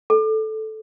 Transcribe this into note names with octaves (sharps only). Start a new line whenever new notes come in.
A4